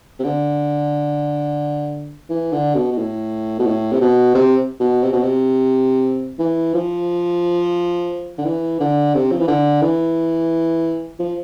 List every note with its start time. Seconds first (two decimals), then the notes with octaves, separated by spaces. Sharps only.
0.19 C3
0.24 D3
2.29 E3
2.52 D3
2.75 B2
2.92 B2
2.98 A2
3.59 B2
3.66 A2
3.92 C3
4.01 B2
4.34 C3
4.80 B2
5.03 C3
5.13 B2
5.23 C3
6.39 E3
6.74 F3
8.38 D3
8.45 E3
8.80 D3
9.14 C3
9.32 F3
9.40 E3
9.47 D3
9.82 E3
11.19 F3